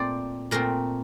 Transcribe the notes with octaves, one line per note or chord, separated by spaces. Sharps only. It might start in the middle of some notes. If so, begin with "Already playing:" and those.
Already playing: A#2 A3 C4 C5 D5
A#2 A3 C4 A#4